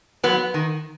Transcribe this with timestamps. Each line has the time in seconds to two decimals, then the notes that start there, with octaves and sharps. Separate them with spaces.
0.24 F#3 B3
0.54 D#3